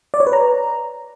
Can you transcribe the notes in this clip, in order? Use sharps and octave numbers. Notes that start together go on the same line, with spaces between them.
D5
C#5
B4
A#5